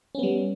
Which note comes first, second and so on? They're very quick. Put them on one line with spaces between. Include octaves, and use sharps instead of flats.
C#4 B3 G3